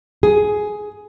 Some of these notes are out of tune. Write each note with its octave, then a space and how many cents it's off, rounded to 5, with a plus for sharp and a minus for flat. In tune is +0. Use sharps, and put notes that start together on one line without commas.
G#4 +10